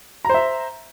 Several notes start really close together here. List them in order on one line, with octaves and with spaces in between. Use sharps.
A#5 C5 E5